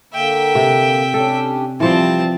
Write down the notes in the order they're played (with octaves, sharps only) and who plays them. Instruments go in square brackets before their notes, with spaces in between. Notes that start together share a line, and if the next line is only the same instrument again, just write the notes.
[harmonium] D3 A#3 [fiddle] E5 G5
[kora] C3
[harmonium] C#4 D4 G4 [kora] A4
[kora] E3 F3 [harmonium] G3 [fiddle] C4 A5